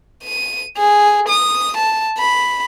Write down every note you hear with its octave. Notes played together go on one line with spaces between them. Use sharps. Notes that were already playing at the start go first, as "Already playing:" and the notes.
D#7
G#4
D#6
A5
B5